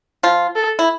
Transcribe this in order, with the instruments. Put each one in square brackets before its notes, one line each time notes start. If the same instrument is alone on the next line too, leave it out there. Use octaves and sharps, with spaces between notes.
[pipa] F3 F4
[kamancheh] A4
[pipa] E4